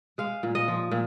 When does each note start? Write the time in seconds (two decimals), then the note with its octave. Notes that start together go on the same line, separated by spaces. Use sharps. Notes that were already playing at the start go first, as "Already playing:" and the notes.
0.18 G#3 F5
0.43 A#2
0.55 D#5
0.68 F3
0.92 A#2